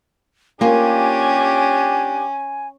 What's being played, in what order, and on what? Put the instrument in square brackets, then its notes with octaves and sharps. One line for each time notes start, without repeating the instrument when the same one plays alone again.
[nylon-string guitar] A#3 F4 [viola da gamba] C#4 [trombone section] D4 G4 [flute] G#5